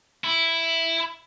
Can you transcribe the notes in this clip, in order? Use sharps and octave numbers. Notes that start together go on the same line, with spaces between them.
E4